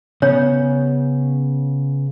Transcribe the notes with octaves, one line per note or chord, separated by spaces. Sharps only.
C#3 B3 C#4 C#5